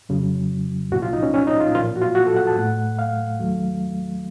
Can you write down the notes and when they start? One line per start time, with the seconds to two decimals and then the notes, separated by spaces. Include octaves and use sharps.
0.09 F2 C#3 F#3
0.92 C2 A#2 F3 F#4
1.02 F4
1.13 D#4
1.23 C#4
1.34 C#4
1.47 D#4
1.60 F4
1.75 A#2 F3 A#3 F4
1.96 F#4
2.02 F4
2.15 F#4
2.27 A4
2.36 F#5
2.47 A5
2.56 A2 A3 F#5
2.99 F5
3.40 D#2 D#3 F#3 A3